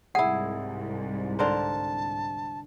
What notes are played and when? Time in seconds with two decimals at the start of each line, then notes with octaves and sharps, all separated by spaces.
0.15 C2 G#2 E4 G#4 F#5
1.39 D3 A#4 C5 A5